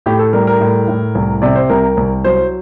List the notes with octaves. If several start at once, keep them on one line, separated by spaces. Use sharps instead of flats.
A2 G4
A4
G3 A#4
A#4
A2
A2
C2
C3 D5
C5
C2 A#4
C2
F#3 C5